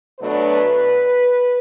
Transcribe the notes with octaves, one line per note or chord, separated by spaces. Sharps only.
B2 F#3 A3 D4 B4